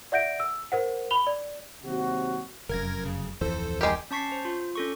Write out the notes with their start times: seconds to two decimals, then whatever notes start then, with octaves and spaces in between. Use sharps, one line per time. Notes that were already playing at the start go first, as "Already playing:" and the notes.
0.12 D5 E5 F#5 G6 A#6 D7
0.40 E6
0.72 A#4 C5 F#5
1.11 B5 F7 G7
1.27 D5
1.85 D#2 C3 F#3 F#4
2.69 F1 F#2 A#4 G#6 A#6
3.05 C#3
3.41 D1 F2 E3 A4 C5
3.81 G#3 G4 A#4
4.11 C#4 A5 C#6 B6 C7
4.32 C5
4.45 F4
4.75 C#4 A4 C#6